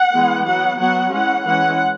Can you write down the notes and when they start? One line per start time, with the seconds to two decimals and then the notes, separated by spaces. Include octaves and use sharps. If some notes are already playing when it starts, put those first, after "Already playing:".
Already playing: F#5
0.13 E3 G#3 B3
0.45 F#3 B3 F#5
0.79 F#3 B3 F#5
1.11 E3 G#3 C#4 F#5
1.45 E3 G#3 C#4 F#5